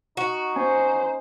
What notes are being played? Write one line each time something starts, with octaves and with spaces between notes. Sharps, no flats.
D#4 F#4
C#4 C5 G#5